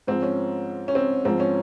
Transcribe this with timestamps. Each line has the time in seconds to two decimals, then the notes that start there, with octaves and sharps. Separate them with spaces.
0.07 G#2 F3 C4
0.22 C#4
0.88 C#4
0.95 C4
1.25 G#2 F3 C4
1.40 C#4